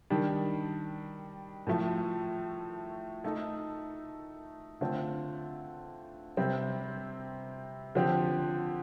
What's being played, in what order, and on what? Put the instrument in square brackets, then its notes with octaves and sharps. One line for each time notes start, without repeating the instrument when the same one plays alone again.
[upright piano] D#3 G3 D4
A2 F3 A3
A3 D#4 A4
D3 A3 C4 F4
C3 G3 C4
D3 F3 C4 G4